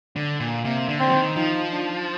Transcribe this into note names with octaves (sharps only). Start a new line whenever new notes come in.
D3
A#2
C3 A#3
D3
C4
F3
D#3
F3 D#4
D4